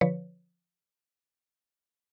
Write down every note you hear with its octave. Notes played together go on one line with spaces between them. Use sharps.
D3 F3 B4 C#5